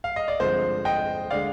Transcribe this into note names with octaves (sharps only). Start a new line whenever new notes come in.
F5
D#5
D5
G2 D3 F3 G#3 C4 C5
D#5 G5
D3 G#3 D5 F5